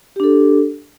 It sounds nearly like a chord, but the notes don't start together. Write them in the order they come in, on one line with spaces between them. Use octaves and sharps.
G4 D4 A4